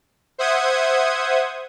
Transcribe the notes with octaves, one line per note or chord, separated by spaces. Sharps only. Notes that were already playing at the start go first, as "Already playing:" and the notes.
C5 E5 F#5 D#6 G#6